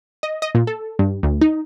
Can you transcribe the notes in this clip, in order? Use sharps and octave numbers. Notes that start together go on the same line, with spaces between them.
D#5
D#5
A#2
A4
G2
D2
D#4